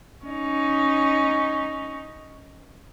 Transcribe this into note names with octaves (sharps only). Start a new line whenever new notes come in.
C#4 D#4